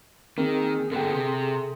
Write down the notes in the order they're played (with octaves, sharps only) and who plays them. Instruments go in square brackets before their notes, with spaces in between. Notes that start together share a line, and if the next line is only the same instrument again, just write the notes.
[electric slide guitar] D#3 [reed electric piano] A#3 [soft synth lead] C4 [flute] G#4
[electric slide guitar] D3 B3 [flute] G#4 [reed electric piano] A4 G5
[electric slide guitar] C3 [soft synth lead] C6